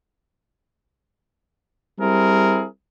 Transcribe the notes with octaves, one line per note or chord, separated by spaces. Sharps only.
G3 C4 E4 G#4 A#4